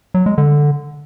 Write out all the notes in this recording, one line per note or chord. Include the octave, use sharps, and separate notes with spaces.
F#3
G#3
D3